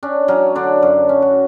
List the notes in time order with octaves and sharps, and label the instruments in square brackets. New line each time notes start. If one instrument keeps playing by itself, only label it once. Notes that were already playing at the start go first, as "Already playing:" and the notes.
[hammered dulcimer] C#4 D4
F#3 C#4
D3 D4
F#2
C#4
F#4